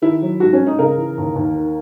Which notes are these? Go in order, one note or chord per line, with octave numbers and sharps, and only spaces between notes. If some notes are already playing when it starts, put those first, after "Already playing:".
D#3 E4
F#3
G#2 F#4
C#4
G#2
D#4
C#3 A#4
E3
D#2
D#2
D#3